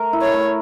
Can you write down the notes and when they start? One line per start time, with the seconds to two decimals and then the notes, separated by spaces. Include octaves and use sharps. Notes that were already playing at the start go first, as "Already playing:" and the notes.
Already playing: A3 A#4
0.13 E4
0.22 C#5
0.33 A3